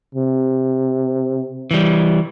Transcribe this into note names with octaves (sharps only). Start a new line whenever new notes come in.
C3
E3 G3